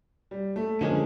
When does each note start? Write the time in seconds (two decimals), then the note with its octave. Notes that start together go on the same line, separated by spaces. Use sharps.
0.31 G3
0.56 A3
0.81 D3 F3 G#3 A#3 C#4